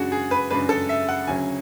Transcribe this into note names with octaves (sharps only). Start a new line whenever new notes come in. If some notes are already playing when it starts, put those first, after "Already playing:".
Already playing: F#2 C#3 G#3 D4 F#4 G#4
G#4
B4
F#2 C#3 G#3 D4 B4
A4
E5
F#5
D2 C#3 F#3 C#4 G#5